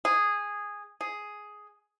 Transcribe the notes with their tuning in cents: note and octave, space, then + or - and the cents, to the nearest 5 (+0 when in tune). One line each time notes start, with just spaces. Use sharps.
G#4 -10
G#4 +5